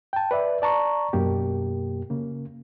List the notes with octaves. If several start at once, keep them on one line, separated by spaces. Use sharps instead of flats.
G5 A5
B4 D5 E5
D5 A5 A#5 C#6
F#2 B2 A#3 G4
C#3 A#3